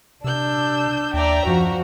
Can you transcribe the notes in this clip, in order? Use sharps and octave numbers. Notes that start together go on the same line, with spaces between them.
C3 D4 E6 G6
D#2 D5 E5 G5 A#5
F#2 F3 F#4